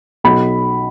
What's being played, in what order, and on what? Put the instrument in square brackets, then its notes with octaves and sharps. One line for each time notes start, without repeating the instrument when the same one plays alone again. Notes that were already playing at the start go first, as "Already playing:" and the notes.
[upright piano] B1 B5